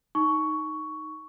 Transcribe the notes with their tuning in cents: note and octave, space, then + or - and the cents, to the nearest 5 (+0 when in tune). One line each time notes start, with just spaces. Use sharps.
D#4 +0 C#6 +10